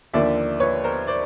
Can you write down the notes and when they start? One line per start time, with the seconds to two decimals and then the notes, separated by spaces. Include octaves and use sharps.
0.13 D#2 D3 F3 A#3 D5 E5
0.60 B4 C#5
0.84 A#4 C5
1.07 C5 D5